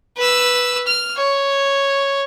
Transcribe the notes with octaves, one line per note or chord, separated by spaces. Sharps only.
B4 E6
F6
C#5